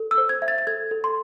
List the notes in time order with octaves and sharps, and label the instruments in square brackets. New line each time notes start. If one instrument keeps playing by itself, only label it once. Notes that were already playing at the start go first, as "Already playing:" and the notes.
Already playing: [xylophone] A4
E6
C5
G#6
E5
A6
A6
A4 G#6
A4
C6